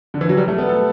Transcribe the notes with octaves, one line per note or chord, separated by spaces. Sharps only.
D3
E3
F#3
G3
A3
B3
A4